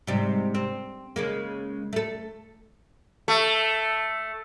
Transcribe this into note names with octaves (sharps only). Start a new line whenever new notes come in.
G#2 C3 G3
C4
C#3 G#3 A#3
A3 A4
A3